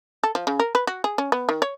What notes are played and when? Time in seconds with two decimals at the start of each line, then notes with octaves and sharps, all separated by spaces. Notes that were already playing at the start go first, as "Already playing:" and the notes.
0.24 A4
0.35 F3
0.47 C#3
0.60 A#4
0.75 B4
0.87 F#4
1.04 G#4
1.18 C#4
1.32 B3
1.49 D#3
1.62 C#5